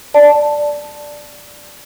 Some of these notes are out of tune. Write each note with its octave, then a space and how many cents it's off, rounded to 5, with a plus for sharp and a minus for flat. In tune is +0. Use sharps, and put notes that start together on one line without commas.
D5 +0 A5 +0